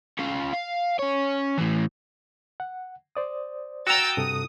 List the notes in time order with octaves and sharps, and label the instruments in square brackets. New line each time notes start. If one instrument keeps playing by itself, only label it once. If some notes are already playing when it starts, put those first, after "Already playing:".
[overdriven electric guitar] C#4 F4
F5
C#4 C#5
A2 E3
[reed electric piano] F#5
C5 D5 D#6
[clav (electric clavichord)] F#4 A#5 [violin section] G5 E6 A6
[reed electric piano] G2 C3 A4 [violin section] D#6